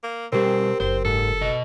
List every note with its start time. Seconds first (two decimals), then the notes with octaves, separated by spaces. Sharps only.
0.04 A#3
0.32 B2 G3 C4 G4 A#4
0.80 F#1 C4 C5
1.05 G#2 A4
1.41 B2 D#5